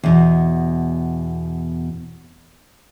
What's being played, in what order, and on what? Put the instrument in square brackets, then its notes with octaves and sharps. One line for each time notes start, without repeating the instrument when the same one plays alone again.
[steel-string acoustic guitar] E2 B2